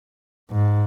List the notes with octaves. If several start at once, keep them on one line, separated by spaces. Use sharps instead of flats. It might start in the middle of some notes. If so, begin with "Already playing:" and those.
G#2